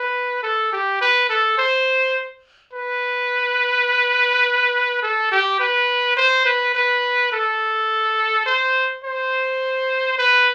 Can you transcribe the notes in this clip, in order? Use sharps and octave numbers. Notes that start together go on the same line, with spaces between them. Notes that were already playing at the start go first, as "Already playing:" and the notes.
Already playing: B4
A4
G4
B4
A4
C5
B4
A4
G4
B4
C5
B4
B4
A4
C5
C5
B4